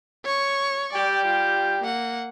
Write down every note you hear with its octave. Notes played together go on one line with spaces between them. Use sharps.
C#5 C#6
G3 G4 D5 G5
F4
A#3 F#5